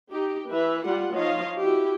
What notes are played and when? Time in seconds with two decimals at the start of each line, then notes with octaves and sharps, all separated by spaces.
0.12 D#4 G4
0.50 E3 B4 E5
0.84 G3 F4 F#5
1.15 F3 D#4 F4 C#5 D#5 F5
1.61 E4 F#4 G4